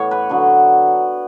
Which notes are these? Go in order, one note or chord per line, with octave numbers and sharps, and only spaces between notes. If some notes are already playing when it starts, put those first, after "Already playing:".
Already playing: A2 E3 B3 C#5
B4
D3 F#3 B3